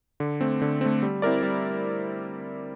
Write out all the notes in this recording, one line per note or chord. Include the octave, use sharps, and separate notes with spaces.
D3
A3 C4
D3
A3 C4
G3
C4 E4 A#4 D5
G3